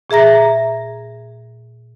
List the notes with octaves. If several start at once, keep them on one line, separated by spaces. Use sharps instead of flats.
A#2 G#4 E5 A#5 A#6